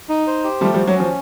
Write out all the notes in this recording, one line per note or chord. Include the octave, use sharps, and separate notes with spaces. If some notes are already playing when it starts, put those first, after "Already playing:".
D#4
C5
G4
F3 G3 A3
F3 G3
F#4
F#3
F3 C#4